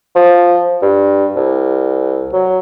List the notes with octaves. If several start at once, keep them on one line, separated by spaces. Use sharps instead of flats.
F3
G2
C2
F#3